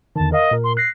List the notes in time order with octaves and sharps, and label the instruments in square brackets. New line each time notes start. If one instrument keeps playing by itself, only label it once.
[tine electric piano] E2 D3 D#3 [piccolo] A5
[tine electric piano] A#4 F5 [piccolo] D#5
[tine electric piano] A#2 A#4
[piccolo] C6
[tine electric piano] F#6 A#6 [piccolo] C7